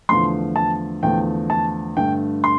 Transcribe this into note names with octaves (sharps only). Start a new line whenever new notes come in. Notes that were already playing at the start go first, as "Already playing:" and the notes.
E2 D3 F3 A3 C6
A5
E2 D3 F3 A3 G5
A5
G2 D3 A3 G5
C6